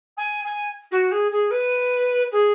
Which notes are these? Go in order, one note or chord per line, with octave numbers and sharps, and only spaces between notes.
G#5
G#5
F#4
G#4
G#4
B4
G#4